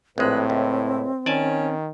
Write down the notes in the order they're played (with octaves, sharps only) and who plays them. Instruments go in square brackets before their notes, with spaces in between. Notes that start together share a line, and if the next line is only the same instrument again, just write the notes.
[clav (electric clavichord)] A#1 G#3 [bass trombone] A2 [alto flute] C4 [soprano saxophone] B4
[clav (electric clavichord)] C#2 [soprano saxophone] E4
[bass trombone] D#3 [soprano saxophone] C#4 [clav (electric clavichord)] D5 G#5 A5